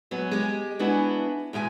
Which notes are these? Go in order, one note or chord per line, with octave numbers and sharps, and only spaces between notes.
F#3 G#3 B3
G#3 G4
G#3 B3 D4 E4 F#4 G#4
E2 B2 G#3 G#5